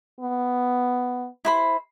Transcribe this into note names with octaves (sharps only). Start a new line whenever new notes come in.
B3
E4 C5 B5